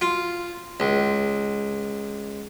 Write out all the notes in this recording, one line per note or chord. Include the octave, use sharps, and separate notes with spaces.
F4
C#2